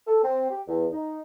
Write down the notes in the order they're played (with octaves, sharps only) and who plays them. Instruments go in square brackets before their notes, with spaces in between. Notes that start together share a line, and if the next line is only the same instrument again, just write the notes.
[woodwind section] A4
C4
G4
E2
D#4